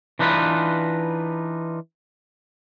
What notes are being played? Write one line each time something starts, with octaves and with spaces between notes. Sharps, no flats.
E3 D4 D#4 F4 B4